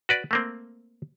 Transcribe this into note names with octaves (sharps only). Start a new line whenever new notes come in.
F#4 B4 D5
A3 A#3 C4